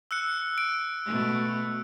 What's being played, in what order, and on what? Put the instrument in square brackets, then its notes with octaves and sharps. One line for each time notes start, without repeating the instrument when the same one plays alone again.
[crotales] E6 F#6 C#7
D7
[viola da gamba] B2 A3